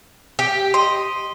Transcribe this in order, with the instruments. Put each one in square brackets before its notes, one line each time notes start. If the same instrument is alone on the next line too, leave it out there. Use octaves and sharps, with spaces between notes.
[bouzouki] G4
[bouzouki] D#5 [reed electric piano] C6